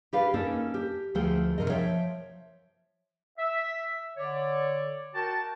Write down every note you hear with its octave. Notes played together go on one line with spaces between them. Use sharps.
G4 G#4 B4 D5 F5
A#3 C#4 D#4 A4
G4
D2 F3 A3 G#4 G5
D#2 C3 G#3 A#4 D#5
F3 C#5 E5 G5
E5
D3 C#5 D5
F#4 A#4 G5 A5